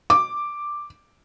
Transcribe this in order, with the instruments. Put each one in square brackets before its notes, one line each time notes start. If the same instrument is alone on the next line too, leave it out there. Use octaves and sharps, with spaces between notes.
[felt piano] D6